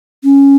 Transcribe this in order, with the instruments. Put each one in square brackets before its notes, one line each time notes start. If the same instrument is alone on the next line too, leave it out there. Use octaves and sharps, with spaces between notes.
[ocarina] C#4